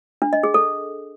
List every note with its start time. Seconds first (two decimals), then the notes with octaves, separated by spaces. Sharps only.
0.22 D4
0.33 D#5
0.43 G#4
0.54 A4